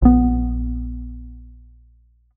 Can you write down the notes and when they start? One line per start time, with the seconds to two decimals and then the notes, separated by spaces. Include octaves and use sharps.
0.02 A#1 B3